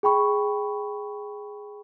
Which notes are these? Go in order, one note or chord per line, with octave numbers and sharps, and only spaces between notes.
G#4 G5 B5 C#6